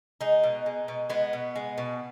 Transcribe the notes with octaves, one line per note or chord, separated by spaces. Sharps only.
G#3 D#4
B2
G#3
B2
G#3 B3
B2
G#3
B2